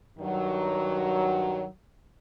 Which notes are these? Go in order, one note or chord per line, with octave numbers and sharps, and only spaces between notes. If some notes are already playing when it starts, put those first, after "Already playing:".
G2 D#3 F#3